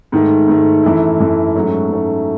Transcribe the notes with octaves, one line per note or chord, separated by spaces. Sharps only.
G#2 D#3 A3
G#2 D#3 A3
F#2 E3 A3 E4
F#2 E3 A3 E4
G#2 F#3 A3 C#4
G#2 F#3 A3 C#4